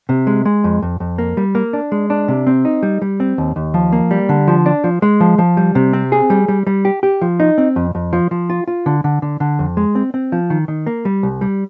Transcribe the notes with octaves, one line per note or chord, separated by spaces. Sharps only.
C3
G#3
G#3
F2
F2
F2
A#3
G3
A#3
D4
G#3
D4
C3
C4
D#4
G3
G3
C4
D#2
D#2
F3
A#3
G3
D3
F3
D4
F3
G#3
F3
F3
G3
C3
C4
G#4
G3
G3
G3
G4
G4
F3
D#4
C4
F2
F2
F3
F3
F4
F4
D3
D3
D3
D3
F2
G#3
C4
C4
F3
D#3
D#3
A#3
G3
C2
G3